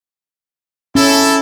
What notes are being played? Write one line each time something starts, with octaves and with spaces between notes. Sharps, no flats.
C#4 E4 A4